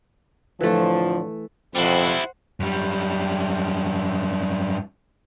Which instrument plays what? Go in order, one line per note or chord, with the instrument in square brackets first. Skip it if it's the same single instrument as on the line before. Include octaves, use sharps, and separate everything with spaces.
[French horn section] A2 D3 F3 [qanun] E3 A3
[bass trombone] F2 [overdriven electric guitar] G3 E4 [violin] C5 F#5
[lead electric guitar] F#2 G3